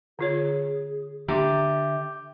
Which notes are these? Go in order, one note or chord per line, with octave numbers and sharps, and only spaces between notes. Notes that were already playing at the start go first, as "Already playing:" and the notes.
D3 F4 G#4 C#5
D3 G4 E5 A#5 C6